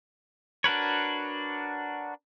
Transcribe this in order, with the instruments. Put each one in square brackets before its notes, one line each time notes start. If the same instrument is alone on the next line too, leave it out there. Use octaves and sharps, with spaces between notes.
[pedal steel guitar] D4 F#4 A#4 B4 C#5